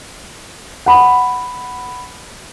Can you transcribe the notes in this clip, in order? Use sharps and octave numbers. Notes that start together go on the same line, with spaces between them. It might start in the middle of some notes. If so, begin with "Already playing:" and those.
F#5 B5